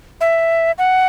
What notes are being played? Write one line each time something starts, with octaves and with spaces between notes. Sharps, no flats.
E5
F#5